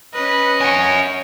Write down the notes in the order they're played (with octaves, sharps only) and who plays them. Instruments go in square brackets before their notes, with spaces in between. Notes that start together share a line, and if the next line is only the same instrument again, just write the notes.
[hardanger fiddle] C#4 D#5 [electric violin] B4
[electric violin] C#5 [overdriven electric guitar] F#5 G#5